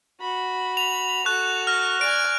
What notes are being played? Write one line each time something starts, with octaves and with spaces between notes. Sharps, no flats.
F#4 B5
F7
F#4 A4 C#6 F#6
F6 A#6
D5 G#5 D7 F7